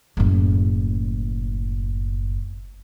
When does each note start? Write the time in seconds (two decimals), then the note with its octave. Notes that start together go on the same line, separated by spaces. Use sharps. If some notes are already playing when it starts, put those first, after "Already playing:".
0.17 F#1 A2